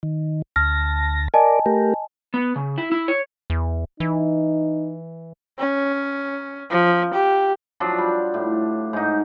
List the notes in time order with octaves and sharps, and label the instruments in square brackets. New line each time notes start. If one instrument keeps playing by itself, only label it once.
[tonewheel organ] D#3
[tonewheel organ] D2 A5 A#6 [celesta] F6
[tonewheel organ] A#4 D5 [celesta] D#5 G#5 A5
[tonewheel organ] A3 G4 A#4
[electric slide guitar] B3
C#3
E4
E4
C#5
[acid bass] E2
[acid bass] E3 [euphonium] D#4
[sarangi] C#4
F3
G4
[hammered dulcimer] F3 F#3 D4
G3
A2
G#2 D#4